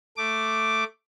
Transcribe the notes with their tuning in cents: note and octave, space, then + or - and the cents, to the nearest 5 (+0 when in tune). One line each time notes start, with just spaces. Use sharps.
A3 +5 D6 +0